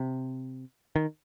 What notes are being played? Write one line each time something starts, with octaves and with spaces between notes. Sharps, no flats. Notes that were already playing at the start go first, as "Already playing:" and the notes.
Already playing: C3
D#3